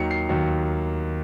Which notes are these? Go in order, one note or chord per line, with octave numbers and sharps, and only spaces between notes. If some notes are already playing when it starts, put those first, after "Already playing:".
Already playing: D#2 D#3 F#3 C#7
C7
D#2 D#3 F#3